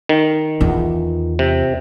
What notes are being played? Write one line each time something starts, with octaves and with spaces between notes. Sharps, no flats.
D#3
E2 F4
C3